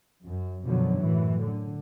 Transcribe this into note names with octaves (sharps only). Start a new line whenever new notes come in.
F#2
F#2 B2 D3 F3 F#3
F#2 A2 E3
D3